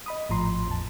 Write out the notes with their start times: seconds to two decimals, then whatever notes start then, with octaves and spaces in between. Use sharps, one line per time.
0.06 D#5 B5 D#6
0.29 G#1 A2 F3 A#5 C6
0.68 E2 A5